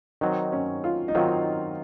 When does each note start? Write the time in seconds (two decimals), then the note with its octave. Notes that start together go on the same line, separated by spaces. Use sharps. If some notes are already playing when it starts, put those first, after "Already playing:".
0.21 D#3 F#3 C4 D#4
0.52 C#4
0.84 F4
1.08 D#4
1.15 D#3 F#3 C4 F4